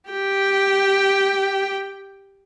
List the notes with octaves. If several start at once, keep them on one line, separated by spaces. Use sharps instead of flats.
G4 G5